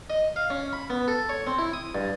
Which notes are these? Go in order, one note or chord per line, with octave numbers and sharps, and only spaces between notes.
D#5
F5
C#4
B5
B3
A4
C#5
C4
E4
D#6
G2